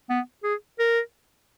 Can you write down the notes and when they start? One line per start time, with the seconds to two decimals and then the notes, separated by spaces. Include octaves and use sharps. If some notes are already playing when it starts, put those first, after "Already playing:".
0.10 B3
0.43 G#4
0.79 A#4